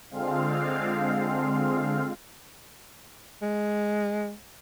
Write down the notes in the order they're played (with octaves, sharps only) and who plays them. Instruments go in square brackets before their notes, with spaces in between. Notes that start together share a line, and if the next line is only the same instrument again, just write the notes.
[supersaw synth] D3 G#3 C4 F4 F5
[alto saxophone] G#3